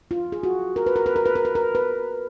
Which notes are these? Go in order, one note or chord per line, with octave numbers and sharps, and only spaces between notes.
F4
G#4
F#4
A#4
B4
A#4
B4
A#4
B4
A#4
B4
A#4
B4